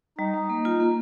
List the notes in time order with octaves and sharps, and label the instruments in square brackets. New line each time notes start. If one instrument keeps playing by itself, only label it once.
[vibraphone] G3 [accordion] D#4
[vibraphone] G3
A#3
F4
A#3